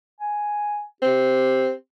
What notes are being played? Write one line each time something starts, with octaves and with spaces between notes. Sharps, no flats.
G#5
C4 G4